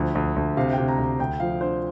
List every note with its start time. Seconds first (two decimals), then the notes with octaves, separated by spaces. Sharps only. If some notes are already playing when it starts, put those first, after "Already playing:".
Already playing: D2 F3
0.15 D2
0.36 D2
0.57 C3 F5
0.73 C3 G5
0.88 A#5
0.98 D2
1.04 A#5
1.19 D2 G5
1.40 F3 F5
1.61 D3 C5